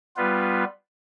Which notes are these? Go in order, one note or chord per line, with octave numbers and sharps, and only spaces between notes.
G3 B3 F4 B4